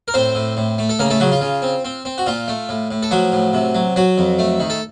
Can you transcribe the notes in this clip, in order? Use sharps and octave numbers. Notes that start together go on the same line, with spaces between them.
A#4
A2 C4 C5
A2
A2
A3
A4
C#3 A#3 A#4
A3 A4
C#3 F#3 F#4
F4
C#3
C4
C4
C4
F#4
A#2 F4
A3
A2
A2
A4
F3 F#3 F#4
A2
C3
F#3
F#3 F#4
F2
A3
D#3
A4